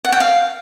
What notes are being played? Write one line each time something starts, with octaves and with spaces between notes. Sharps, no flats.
F#5
G5
F5